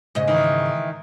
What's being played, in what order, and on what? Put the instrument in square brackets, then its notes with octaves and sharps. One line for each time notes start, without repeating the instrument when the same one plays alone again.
[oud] G#2 C#3 D#5
[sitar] D#3 E3